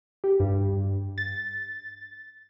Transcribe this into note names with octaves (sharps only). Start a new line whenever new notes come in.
G4
G2
A6